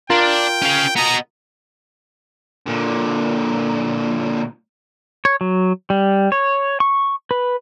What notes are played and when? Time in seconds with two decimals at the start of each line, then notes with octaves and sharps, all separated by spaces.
0.10 D4 F4 A#4 G5
0.62 C#4 F5
0.96 B3 D#5 A#5
2.66 A#2 D3
5.25 C#5
5.41 F#3
5.90 G3
6.32 C#5
6.80 C#6
7.31 B4